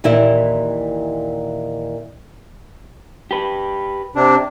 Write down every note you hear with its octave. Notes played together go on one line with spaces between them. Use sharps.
D#2 A#2 E3 E4 A#4 E5
G4 B4
C3 D4